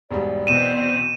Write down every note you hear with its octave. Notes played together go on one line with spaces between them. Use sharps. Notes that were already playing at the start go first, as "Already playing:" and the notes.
E1 G#2 G3 D5
E2 B2 C4 D#7 E7